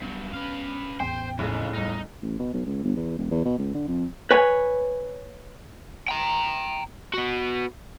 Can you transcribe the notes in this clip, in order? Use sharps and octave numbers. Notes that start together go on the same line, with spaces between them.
G2 F#3 B3
B3 C#4 B4 F5
A1 E2 C5 G5
F1 C#2 A2 C#3
E2 G3 D#4
A1
B2
B1
C#2
G1
E2
E1
E2
B2
C#2
D3
F2
B4 C#5 G#5
G5 A#5
B3 F#4